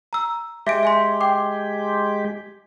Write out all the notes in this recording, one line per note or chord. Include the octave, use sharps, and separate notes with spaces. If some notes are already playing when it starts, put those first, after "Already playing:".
A#5 E6
G#3 G4 E5 B6 D7
E5 G#5 C6
G5 D6